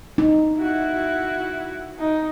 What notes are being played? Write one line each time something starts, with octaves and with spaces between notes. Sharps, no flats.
D#4
E4 F#4
D#4